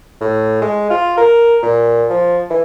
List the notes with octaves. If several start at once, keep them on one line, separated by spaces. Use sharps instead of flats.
A2
G#3
F4
A#4
A#2
F3
E3